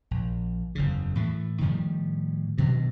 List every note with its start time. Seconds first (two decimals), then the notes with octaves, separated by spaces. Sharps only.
0.11 A#1
0.75 F#1 E2 C#3
1.15 A2 E3 A3
1.61 A2 D#3 F3 G3
2.58 G2 B2 D#3 F#3